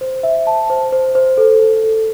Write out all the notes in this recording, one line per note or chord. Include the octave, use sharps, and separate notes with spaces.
C5
E5
A5
C5
C5
C5
A4
A4
A4